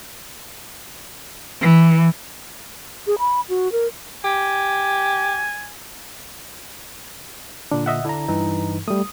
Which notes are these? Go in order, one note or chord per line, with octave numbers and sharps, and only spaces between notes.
E3
G#4
B5
F#4
A#4
G4 G#5
A#2 D3 D4
D#5 E5 F#5
D3 D4 E4 A#5
G2 E3 D#4
G3 A3 D#6